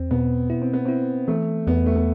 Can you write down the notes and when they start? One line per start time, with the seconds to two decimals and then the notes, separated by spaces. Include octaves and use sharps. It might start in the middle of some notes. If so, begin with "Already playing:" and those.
Already playing: E2 C4
0.11 B2 B3
0.50 E4
0.62 C4
0.73 B3
0.85 C4 E4
1.28 E3 A3
1.67 E2 B3
1.86 A3
1.96 B3